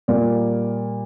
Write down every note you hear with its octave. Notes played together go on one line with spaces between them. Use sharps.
A#2 G3 A#3 D5